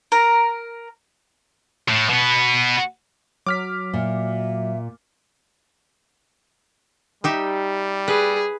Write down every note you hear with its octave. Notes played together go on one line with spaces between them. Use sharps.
A#4 A#5
A2
B2 B3
F#3 D6 F6 B6
A#2 E5
G3 D#4 G4 E5
G#4 B4